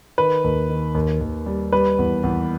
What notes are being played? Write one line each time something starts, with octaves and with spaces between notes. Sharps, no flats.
D#3 B4
D#2
D#3
D#2
D#2
G3
G3 B4
E2
E2